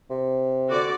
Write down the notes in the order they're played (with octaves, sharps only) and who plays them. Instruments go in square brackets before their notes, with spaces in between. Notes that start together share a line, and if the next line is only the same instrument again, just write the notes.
[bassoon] C3
[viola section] D3 F#4 D5